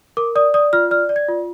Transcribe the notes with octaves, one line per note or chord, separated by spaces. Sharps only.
A#4 D6
D5 D#6
D5 D#6
F4 F6
D5 F6
D5
G#6
F4